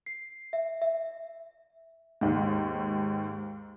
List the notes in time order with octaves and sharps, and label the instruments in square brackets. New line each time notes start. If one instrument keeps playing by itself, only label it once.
[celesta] C7
E5
E5
[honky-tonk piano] D#2 G#2